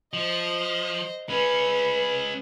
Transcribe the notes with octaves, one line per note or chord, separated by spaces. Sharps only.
F3 C5 D#5
G#3 C#4 B4